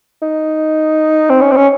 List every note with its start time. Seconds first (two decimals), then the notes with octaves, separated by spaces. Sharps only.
0.22 D#4
1.30 C4
1.41 C#4
1.51 C4
1.57 C#4